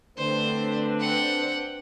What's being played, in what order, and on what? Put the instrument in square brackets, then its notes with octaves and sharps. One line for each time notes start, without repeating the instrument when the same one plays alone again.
[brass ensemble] D3 A3 [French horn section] C4 D4 B4 [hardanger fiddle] C5
[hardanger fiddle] F#5 G5